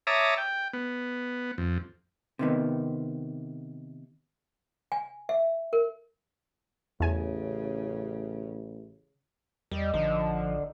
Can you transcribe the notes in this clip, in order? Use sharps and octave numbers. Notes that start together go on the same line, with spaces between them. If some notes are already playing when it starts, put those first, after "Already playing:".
C#5 E5 A5 A#5 D6 D#6
G5
B3
F2
C3 D#3 B3
G#5
E5
A#4
A1 E2 C#3 G#5
E2 G3 D#5
A1 D3 F3 D#4